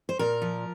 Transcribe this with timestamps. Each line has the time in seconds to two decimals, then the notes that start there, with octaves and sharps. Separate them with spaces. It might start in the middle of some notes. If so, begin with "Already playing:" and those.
0.09 C5
0.19 A#2 A#4
0.42 F3